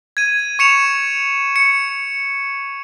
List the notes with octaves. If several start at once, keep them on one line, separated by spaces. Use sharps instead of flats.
G#6 D#7
C#6 C#7 E7 F7
C#7